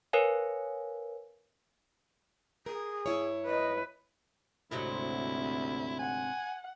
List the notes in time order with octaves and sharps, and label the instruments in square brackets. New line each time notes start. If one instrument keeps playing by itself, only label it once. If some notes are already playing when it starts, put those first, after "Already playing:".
[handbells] A#4 B4 C#5 F5 G#5
[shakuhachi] G#4 [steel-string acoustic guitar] A#4
[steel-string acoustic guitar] G2 E4 C#5
[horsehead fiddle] B4 [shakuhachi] D#5
[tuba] D2 [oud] G#2 C3 F#3 [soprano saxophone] E4
[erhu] F#5 [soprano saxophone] G#5